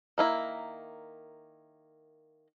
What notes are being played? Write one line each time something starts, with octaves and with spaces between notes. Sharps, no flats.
D#3 A#3 E4